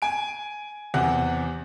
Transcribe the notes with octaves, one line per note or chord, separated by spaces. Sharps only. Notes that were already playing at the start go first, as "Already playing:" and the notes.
G#5 D7
E2 C3 F#5